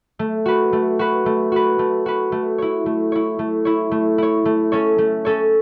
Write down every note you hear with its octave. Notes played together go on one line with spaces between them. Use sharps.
A3
F#4 B4
A3
F#4 B4
A3
F#4 B4
A3
F#4 B4
A3
E4 C#5
A3
E4 C#5
A3
E4 C#5
A3
E4 C#5
A3
C#4 A4 C#5
A3
C#4 A4 C#5